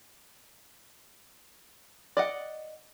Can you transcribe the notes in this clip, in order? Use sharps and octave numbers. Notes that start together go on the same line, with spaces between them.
D5 D#5 F#5